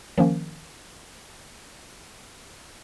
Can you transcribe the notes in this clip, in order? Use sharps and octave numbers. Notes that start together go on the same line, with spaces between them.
D#3 F3 A#3 C#4